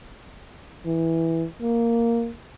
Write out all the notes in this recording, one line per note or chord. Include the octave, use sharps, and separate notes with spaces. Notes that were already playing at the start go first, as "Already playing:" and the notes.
E3
A#3